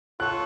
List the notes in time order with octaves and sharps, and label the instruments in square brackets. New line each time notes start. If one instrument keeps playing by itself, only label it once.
[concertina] F4 A4 C#5 [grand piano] F#6